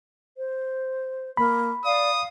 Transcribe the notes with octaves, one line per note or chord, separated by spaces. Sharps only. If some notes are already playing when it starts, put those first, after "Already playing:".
C5
A#3 B5
D5 F5 D#6